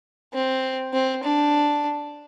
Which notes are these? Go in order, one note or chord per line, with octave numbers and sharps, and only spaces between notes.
C4
C4
D4